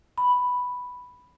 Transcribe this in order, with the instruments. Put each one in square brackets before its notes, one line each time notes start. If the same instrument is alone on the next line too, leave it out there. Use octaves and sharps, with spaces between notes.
[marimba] B5